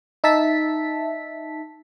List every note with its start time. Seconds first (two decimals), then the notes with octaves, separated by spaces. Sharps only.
0.24 D#4 E5 A5 B6